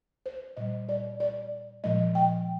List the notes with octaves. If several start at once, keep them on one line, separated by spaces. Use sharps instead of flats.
C5
A#2 G3 D#5
D5
D5
A#2 F3 G#3 D#5
G5